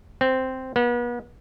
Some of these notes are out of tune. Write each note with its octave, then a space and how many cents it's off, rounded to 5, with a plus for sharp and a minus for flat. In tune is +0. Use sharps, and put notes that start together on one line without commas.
C4 -5
B3 -40